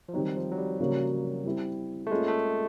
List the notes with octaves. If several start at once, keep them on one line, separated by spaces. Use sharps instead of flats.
F3
D#3 F#3 G3 C4 D#4
F3
F#3
G3
C#3 F#3 A#3 C#4 F#4
G3 C4 E4
A3
G#3 A#3 C#4 F4 G#4
A3